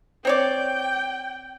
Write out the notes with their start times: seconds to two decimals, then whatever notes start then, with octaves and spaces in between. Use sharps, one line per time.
0.25 C4 C#5 D5 G5